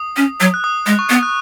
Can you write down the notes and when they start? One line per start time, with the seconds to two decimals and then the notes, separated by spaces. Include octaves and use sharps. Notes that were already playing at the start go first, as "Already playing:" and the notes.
Already playing: D#6
0.16 C#4
0.40 F#3
0.54 F#6
0.64 D#6
0.86 G#3
0.99 C#6
1.10 B3
1.23 F#6